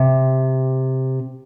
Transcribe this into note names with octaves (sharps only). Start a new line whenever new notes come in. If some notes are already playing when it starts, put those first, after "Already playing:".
Already playing: C3